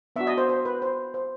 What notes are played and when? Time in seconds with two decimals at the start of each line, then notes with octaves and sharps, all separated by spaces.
0.16 B3 D4 F#4 E5
0.27 D#5
0.38 C5
0.49 C5
0.65 B4
0.82 C5
1.14 C5